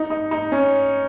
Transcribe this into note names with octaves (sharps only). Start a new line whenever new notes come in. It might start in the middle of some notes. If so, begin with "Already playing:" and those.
Already playing: D#4
D#4
D#4
C#4